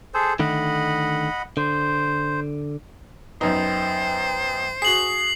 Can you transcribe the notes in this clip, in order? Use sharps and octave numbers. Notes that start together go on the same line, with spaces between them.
G#4 A4 C5
D3 D#3 A3 D#5 F#5 B5
D3 C5
F#2 B3 D#4 C5 G5
F#4 G#4 D#6 C7 F#7